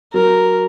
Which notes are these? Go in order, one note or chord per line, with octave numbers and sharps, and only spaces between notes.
F#3 A#4